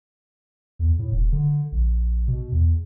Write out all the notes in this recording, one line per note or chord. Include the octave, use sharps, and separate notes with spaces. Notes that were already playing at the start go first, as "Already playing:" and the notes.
E2
A2
E1
D3
A#1
B2
E2